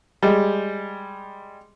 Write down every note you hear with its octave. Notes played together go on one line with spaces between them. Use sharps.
G3 G#3